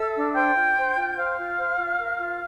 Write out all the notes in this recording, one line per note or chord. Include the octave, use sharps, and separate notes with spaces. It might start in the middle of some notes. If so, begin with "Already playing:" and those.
Already playing: A4 E5 E6
D4
C5 G5 G6
F4
C5
F4
C5 F5 F6
F4
C5
F4
A#4
F4